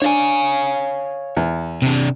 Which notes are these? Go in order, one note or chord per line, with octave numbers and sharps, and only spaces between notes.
D4 C#5 F5 G#5
E2
C3 D4